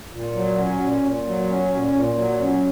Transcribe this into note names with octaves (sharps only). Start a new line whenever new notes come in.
A#2
F#3
C#4
A#2
A#2
F#3
C#4
A#2
A#2
F#3
C#4